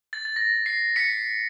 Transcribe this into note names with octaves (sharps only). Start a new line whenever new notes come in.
A6
A6
A#6
C7
B6 C#7